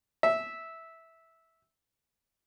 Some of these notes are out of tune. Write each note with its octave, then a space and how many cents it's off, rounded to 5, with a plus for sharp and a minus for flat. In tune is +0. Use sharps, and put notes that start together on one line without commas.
E5 -10